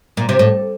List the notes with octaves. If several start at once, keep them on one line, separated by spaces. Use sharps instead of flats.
A#2
C3
A2